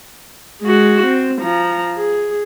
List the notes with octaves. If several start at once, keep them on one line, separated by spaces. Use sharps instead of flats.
G#3 F#4
C4
F3 A#5
G#4